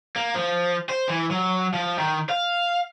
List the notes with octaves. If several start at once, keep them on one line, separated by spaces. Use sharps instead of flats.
A#3
F3
C5
E3
F#3
F3
D#3
F5